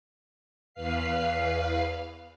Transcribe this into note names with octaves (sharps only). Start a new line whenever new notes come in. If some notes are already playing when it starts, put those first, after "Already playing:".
E2 B4 F5 C7